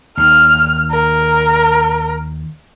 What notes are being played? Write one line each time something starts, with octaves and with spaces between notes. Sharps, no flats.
D#2 D#3 F6
A#4